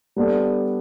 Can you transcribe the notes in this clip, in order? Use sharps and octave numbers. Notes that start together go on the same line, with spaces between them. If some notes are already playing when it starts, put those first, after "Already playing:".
G3 B3 D4 A4